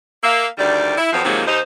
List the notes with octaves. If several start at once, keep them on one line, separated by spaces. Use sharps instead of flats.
A#3 E5 F5
D2 D#3 G3 A3 D5
E4
F2 F3 F#3 B3 C4
C3 D#3 F3 F#3 G#3 A#3
D#2 D#4 C5